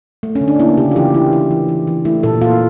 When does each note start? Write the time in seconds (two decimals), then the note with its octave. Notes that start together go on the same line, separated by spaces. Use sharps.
0.23 A3
0.35 C#4
0.41 D3
0.48 D4
0.60 A#3 E4
0.78 C#3 G4
0.91 F4
0.96 E3 G4
1.14 E3 E4
1.32 E3 E4
1.51 E3
1.69 E3
1.87 E3
2.05 A3 E4
2.23 A#2 A4
2.41 A#3 F4